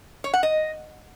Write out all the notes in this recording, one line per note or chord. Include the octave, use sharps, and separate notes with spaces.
C#5
F#5
D#5